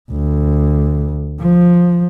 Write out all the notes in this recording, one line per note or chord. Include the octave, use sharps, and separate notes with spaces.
D2
F3